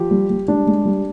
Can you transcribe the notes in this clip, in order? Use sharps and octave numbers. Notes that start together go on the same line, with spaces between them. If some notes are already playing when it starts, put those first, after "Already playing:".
Already playing: F3 G4
G3
G3
G#3 D4
G#3
G3